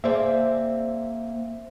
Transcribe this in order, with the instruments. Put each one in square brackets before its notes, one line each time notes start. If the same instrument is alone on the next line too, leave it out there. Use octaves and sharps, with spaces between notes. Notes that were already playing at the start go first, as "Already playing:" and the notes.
[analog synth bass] A#3 [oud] C4 G#4 D5 [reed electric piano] C5 E5